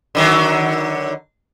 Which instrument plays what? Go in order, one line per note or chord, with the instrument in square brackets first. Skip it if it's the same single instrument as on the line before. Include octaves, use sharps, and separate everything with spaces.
[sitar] D3 D#3 F#3